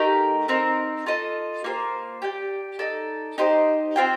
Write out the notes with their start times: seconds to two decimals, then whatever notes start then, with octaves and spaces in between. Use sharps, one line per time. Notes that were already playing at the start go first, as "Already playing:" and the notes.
Already playing: A3 D#4 G4 A#4
0.48 C4 D#4 A#4
1.06 F4 A4 D#5
1.64 A#3 F4 A4 C5
2.22 G4 D5 G5
2.79 D#4 A4 D5
3.38 D#4 G4 C5 D#5
3.96 C4 F4 C5 G5